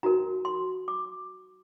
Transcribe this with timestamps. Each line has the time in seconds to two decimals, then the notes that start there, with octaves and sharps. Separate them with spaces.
0.03 D#4 F#4 A#4 A#5
0.45 C6
0.88 D6